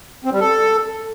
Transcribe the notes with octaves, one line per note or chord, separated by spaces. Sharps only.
C4
G3
A4